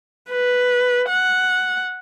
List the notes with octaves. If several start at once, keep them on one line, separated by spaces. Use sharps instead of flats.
B4
F#5